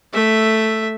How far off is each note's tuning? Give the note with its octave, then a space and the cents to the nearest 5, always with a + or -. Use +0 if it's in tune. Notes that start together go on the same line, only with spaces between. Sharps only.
A3 +0 E5 +0